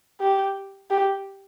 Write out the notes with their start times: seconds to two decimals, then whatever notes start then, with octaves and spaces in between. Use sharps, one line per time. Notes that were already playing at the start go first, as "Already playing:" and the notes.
0.21 G4
0.90 G4